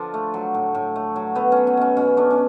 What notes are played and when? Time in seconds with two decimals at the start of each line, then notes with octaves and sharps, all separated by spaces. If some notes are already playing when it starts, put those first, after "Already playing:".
Already playing: D3 F3 D4 F4
0.14 A3
0.34 F#3
0.54 A2
0.75 A2
0.96 A3
1.16 F#3
1.36 A3 B3
1.52 F#3 C#4
1.67 C#4
1.77 B2 C#4
1.97 B2 C#4
2.17 A3 D4
2.31 C#4